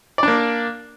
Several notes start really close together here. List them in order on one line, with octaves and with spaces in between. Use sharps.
D5 D4 A#3